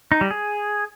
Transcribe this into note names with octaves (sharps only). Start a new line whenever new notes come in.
D#4
G3
G#4